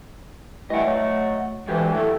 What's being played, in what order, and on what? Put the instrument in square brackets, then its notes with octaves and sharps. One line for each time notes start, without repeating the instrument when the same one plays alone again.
[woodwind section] E3 G3 A3 [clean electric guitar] D#5 F#5
[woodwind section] F#3 A3
[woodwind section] D2 E3 [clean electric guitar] F#3 G#3 G4
[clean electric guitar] F#3 E4 G4 [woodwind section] A3